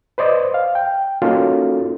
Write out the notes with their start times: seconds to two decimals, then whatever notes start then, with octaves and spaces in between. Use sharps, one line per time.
0.18 B4 C5 D5 D#5
0.54 F5
0.75 G5
1.22 A#3 C#4 D#4 F4 F#4 A4